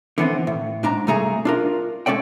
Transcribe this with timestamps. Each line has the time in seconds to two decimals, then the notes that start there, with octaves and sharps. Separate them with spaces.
0.18 D3 E3 B3 C4
0.47 A2
0.83 G#2 D4 A#5
1.07 C2 G2 A3 G#4 A#5
1.45 D4 F4 A#4
2.06 G#3 C#4 A4 D5 G5